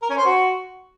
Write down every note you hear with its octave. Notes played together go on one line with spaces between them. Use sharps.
A#4
C#4
C5
F#4